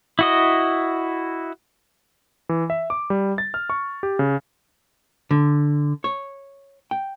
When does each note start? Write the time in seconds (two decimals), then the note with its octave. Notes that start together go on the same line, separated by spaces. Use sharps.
0.19 E4 F#4 D#5
2.49 E3
2.70 E5
2.90 D6
3.10 G3
3.38 A6
3.54 F6
3.70 C#6
4.03 G4
4.19 C#3
5.31 D3
6.04 C#5
6.91 G5